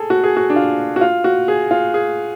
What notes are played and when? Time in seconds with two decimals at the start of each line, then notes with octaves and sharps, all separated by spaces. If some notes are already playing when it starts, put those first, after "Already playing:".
Already playing: G#4 A4
0.10 F#4
0.24 G#4
0.37 F#4
0.50 D4
0.56 F4
0.96 F#4
1.01 F4
1.24 F#4
1.48 G#4
1.71 F4
1.94 G#4